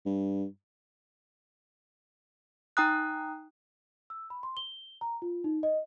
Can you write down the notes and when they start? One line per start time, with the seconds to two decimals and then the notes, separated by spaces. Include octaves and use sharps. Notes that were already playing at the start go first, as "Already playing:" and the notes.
0.06 G2
2.77 D#4 G5 A#5 D#6 F#6
4.10 E6
4.30 B5
4.43 C6
4.57 G7
5.01 A#5
5.22 F4
5.44 D#4
5.63 D#5